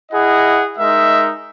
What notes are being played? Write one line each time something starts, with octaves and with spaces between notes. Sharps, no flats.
E4 G#4 D#5 F#5
G#3 D#4 A#4 E5